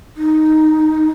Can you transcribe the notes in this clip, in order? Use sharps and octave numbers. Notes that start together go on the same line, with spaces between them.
D#4